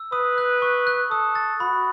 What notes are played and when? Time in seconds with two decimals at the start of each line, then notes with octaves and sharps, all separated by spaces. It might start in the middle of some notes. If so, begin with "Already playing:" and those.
Already playing: E6
0.12 B4 D#6
0.38 F#6
0.62 C#6
0.87 F#6
1.11 A4 D#6
1.35 A6
1.60 F#4 B5